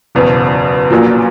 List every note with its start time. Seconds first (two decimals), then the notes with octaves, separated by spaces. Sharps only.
0.15 F#1 E2 B2
0.90 A#1 A#2 F#3